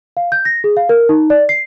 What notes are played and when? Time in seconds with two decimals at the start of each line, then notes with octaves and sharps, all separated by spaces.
0.17 F5
0.32 G6
0.45 A#6
0.64 G#4
0.77 F5
0.89 A#4
1.09 D#4
1.30 D5
1.49 C7